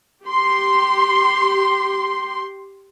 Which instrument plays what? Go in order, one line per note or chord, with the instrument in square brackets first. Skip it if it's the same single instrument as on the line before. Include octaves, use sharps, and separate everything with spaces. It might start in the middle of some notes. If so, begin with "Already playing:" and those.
[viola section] G4 C6